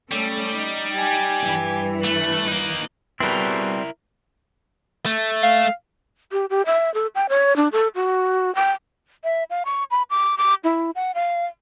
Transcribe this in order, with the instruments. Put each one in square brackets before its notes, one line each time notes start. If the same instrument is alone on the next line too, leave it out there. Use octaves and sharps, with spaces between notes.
[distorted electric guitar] G3 [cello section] A3 C#4 A4
[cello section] D#4
[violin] G4 G#5
[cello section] G2 E3
[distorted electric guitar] A3 [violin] F#6
[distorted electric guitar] A#3 D#4
[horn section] B2 G#4 B4 [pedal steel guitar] G3 C4 [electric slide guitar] E4 A#4
[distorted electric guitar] A3
[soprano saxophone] F5
[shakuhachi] G4
G4
E5
A4
G5
C#5
D4
A4
F#4
G5
E5
F5
C#6
B5
D6
D6
E4
F#5
F5